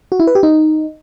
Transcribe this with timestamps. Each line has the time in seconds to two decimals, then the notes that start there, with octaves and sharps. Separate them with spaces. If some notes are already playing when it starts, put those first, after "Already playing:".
0.12 F#4
0.20 E4
0.27 B4
0.35 G4
0.43 D#4